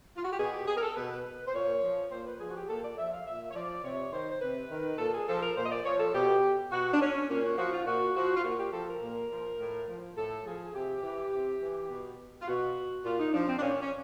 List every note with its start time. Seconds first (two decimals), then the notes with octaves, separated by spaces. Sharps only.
0.17 F4
0.24 F#4
0.32 G4
0.39 B2 G#4
0.53 G4
0.68 G#4
0.76 A#4
0.82 A4
0.96 B2 B4
1.46 C5
1.54 A#2 C#5
1.83 F3
2.11 A#2 C5
2.25 B4
2.40 F3 G#4
2.50 F#4
2.55 G4
2.69 A#2 A4
2.84 D5
2.98 F3 E5
3.13 F5
3.26 A#2 E5
3.51 C#5
3.55 F3 D5
3.84 C3 C#5
4.13 D#3 C5
4.31 C5
4.41 C3 B4
4.71 D#3
4.99 A#2 A4
5.13 G#4
5.28 F3 A4
5.42 A#4
5.56 A#2 C5
5.64 D#5
5.71 D5
5.85 F3 C#5
6.00 A4
6.14 B2 G4
6.72 B2 F#4
6.94 D4
7.01 C#4
7.29 A#2 C#4
7.44 F#4
7.58 F3 F#4
7.73 F4
7.87 A#2 F#4
8.15 F3 F#4
8.37 F4
8.44 A#2 F#4
8.59 G4
8.73 F3 A4
8.88 A#4
9.02 A#2
9.31 F3
9.60 A2
9.88 F3
10.17 A2 A4
10.46 F3 G#4
10.75 C3 G4
11.03 E3
11.32 C3
11.61 E3
11.90 B2
12.41 F4
12.47 B2 F#4
13.05 A#2 F4
13.20 D#4
13.34 F3 D4
13.48 C4
13.58 D4
13.62 A#2 C#4
13.81 C#4